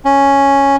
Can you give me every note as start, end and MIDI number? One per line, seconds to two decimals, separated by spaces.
0.05 0.76 61